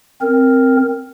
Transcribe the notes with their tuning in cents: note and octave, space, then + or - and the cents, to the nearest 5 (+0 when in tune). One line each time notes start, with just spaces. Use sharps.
C4 +0 A#4 +0